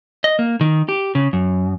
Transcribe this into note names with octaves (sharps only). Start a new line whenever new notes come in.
D#5
A#3
D#3
G4
C#3
F#2